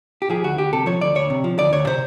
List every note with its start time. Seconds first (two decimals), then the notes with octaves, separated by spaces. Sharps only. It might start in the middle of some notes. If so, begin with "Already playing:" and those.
0.22 G4
0.30 F3 G#4
0.44 D2 F#4
0.58 D2 G4
0.73 C3 A4
0.86 F3 C#5
1.01 D2 D5
1.15 D2 C#5
1.30 C3
1.44 F3
1.58 D2 D5
1.73 D2 C#5
1.87 C3 C5